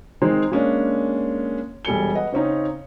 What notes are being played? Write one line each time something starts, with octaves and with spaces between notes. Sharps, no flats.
D#3 G#3 C4 D#4
G#3 A#3 C#4 D4
E1 G3 A4 G#5 C#7 G7
B4 D#5 F#5
C#3 C4 C#4 D#4